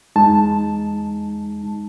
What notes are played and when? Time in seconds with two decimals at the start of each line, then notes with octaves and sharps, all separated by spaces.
0.16 E2 G#3 D#4 A5